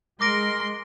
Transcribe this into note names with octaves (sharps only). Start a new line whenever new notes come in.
G#3 A#4 C6 D6 A#6 D7